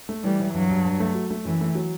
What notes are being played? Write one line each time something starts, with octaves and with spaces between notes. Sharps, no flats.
A3
E3 G3
E3
G2 F#3
G2
G2
A3
F#3
A3
F#2 E3
A3
F#3